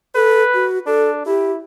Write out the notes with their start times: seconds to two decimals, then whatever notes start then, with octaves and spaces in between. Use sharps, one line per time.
0.15 A4 B4
0.54 F#4
0.87 D4 A4
1.26 E4 G4